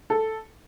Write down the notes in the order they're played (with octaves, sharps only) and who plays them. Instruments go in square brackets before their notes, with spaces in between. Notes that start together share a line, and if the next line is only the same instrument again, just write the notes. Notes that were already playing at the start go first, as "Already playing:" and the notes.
[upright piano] A4